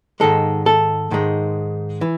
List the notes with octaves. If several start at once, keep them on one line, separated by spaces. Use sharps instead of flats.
G#2 D#3 G#3 A4
A4
G#2 D#3 G#3
E3